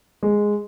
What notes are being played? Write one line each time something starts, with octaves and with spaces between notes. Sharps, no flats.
G#3